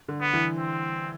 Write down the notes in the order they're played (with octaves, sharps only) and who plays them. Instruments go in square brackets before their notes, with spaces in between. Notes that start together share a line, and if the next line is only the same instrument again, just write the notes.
[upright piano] D3
[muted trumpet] B3
[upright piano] E3
[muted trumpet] C4